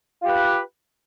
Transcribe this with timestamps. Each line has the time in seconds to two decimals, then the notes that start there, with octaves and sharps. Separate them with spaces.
0.22 F4
0.25 G4
0.28 B4